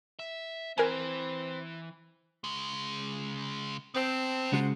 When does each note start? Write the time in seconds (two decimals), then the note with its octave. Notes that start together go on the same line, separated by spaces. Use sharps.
0.19 E5
0.78 E3 C4 A#4 G#5
2.44 C#3 G#3
3.94 B3 C4 A5
4.53 C#3 G#3 F4 F#4 C5 F#5